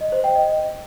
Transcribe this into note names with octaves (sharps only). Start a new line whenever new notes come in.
D#5
C5
G5
D#5